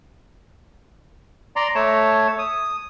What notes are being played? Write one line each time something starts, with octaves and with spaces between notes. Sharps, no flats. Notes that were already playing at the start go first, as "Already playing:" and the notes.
D5 A#5 C6
A3 C#5 A5
D#6